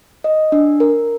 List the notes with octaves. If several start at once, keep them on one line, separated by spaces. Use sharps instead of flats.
D#5
D4
A#4